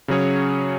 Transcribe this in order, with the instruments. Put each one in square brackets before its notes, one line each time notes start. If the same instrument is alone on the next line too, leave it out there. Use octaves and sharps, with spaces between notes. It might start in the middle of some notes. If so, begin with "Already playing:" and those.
[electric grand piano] C#3 F#3 C#4 G#4 C#5